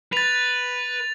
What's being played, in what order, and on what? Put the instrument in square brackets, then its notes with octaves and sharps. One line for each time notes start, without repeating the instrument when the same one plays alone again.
[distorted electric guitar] B4 [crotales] A6 F7